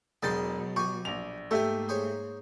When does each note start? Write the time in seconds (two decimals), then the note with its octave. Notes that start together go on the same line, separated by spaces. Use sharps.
0.22 E1 B2 F#3 G#4 G5 C6 A6
0.76 G4 G#5 C#6
1.05 A#1 F7
1.51 G#2 A3 A#3 G4 A4 E5 G#5
1.89 G#4 C5 C#5